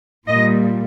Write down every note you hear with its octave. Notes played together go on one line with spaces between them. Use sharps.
A#2 G3 D#5